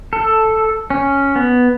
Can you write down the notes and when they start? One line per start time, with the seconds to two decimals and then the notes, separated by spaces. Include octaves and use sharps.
0.13 A4
0.90 C#4
1.36 B3